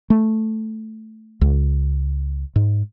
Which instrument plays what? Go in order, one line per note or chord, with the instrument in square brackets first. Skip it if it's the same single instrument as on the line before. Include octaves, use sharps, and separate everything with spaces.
[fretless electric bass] A3
C#2
G#2